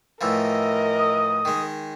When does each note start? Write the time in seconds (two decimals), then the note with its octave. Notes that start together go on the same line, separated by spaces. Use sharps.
0.21 A2 E3 F3 A#4 D#5
0.98 D#6
1.45 D#3 G#3